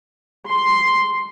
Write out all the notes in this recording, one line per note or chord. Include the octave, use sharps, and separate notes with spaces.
C6